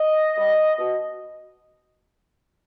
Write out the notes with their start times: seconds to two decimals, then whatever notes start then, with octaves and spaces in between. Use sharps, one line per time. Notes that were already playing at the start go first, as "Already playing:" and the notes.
Already playing: D#5
0.37 G3
0.78 B2